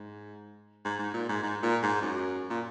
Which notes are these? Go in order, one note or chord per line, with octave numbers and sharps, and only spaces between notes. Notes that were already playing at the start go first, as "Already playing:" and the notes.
Already playing: G#2
G#2
G#2
A#2
G#2
G#2
A#2
G#2
F#2
A#2